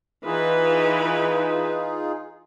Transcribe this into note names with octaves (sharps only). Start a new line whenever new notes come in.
E3 D#4 F4 G#4 B4